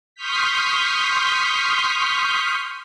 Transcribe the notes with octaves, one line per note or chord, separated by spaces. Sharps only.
C6 C#6 D#6 F6 G6 B6